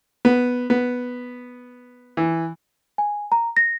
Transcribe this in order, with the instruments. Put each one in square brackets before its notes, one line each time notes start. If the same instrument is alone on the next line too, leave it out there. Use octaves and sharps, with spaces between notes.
[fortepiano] B3
B3
E3
[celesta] G#5
A#5
A#6